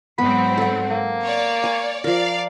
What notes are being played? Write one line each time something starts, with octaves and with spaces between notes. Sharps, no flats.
G#2 F#3 B3 C4 B5
A4 F#5
A#3
C#5 D5
G#5 C#6
F3 A#4 D5 F5